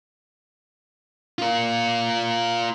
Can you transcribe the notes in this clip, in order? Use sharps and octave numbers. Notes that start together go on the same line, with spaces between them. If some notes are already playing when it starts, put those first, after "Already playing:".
F4 A#4